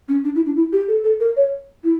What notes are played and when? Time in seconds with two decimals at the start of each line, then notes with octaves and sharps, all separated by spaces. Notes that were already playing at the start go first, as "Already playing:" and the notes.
0.08 C#4
0.24 D4
0.35 E4
0.46 D4
0.56 E4
0.72 G4
0.88 A4
1.04 A4
1.20 A#4
1.36 C#5
1.84 E4